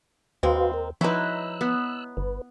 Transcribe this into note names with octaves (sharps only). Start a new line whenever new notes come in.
D#2 G#3 A#3 C4 F#4 B4 F5
A#4
F3 F#3 G#3 D#4 E4 B4 E6 F#6
B3
G1 B4